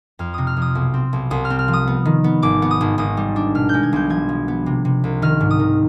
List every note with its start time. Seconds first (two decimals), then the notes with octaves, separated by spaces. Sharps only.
0.19 F2 F6
0.34 C3 D#6
0.47 F6
0.57 F2
0.62 D#6
0.75 B1
0.94 C4
1.13 B1
1.30 C2 D#6
1.45 F6
1.50 C4
1.59 F6
1.68 F3
1.73 D#6
1.87 B3
2.05 D#3
2.24 B3
2.42 G#1 D6
2.62 B3
2.71 D#6
2.81 G#1
2.98 G#1 D#6
3.17 G3
3.36 D4
3.55 B2 F6
3.69 G#3 G6
3.83 G#6
3.93 B1 G6
4.10 F3 G#6
4.29 F3
4.48 B3
4.66 C3
4.85 C3
5.04 C2
5.22 D#3 F6
5.40 G#2
5.51 D#6
5.60 D#3